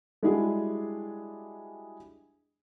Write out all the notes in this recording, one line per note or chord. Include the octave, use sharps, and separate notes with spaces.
G3 G#3 D4 E4 F#4 G#4